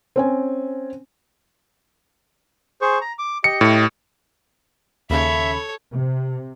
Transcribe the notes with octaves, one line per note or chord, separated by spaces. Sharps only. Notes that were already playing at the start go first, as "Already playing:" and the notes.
C4 C#4 G#5
G#4 C5 C#6
A#5
D6
G4 D#5 C#7
A2
D#2 C#3 A4 C#5 E5 B5
C3